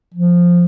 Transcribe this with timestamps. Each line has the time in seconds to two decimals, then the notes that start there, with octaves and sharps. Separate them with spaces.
0.14 F3